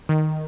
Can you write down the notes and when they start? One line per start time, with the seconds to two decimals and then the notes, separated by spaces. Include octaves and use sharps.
0.09 D#3